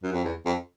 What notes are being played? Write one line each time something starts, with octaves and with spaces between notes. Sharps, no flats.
F#2
F2
E2
F2